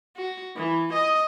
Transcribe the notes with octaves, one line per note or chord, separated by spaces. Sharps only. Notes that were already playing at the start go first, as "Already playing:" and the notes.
F#4
E3
D#5